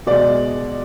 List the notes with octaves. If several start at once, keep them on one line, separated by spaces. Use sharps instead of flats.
B2 G#3 D5